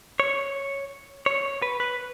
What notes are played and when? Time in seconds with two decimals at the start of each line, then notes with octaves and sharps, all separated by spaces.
0.20 C#5
1.26 C#5
1.62 B4
1.80 B4